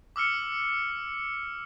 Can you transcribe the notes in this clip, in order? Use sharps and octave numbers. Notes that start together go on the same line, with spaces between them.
D6 E6 F6 C#7